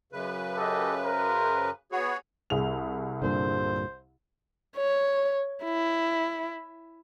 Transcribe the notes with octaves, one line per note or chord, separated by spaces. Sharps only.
F#2 C#3 B4
G4 A4 D#5
A#4 C5
B3 F#4 G#4 C#5
C2 G#4 F7
G2 A#2 D3 C5
C#5
E4